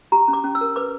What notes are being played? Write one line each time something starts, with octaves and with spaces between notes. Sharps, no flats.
G4 A#5
C#4
D6
C#4
E6
A#4
B4 D6